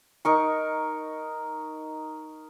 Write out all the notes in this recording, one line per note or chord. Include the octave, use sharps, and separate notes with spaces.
D#4 A#4 C#6